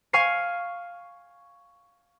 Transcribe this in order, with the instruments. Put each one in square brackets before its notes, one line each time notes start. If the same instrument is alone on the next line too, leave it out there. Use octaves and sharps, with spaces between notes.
[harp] F5 G#5 C#6 F6 C7